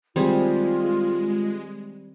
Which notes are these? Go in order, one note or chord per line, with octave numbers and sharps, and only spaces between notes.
D#3 G3 G#3 C4 F4 G#4 C5